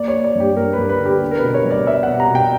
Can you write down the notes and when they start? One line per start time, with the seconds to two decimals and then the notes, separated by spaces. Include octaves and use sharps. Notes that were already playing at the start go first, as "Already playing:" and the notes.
Already playing: A#3 D5
0.08 C#5
0.13 A#3
0.24 D5
0.35 G2 G4
0.57 G2 A#4
0.73 B4
0.78 G2
0.89 B4
1.00 D3
1.06 G4
1.22 B3
1.31 A#4
1.38 B2 B4
1.54 C#5
1.65 G3
1.71 D5
1.87 B3 E5
2.03 F#5
2.08 B2
2.20 A#5
2.30 B2
2.35 G5